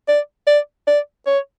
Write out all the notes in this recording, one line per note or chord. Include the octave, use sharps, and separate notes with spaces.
D5
D5
D5
C#5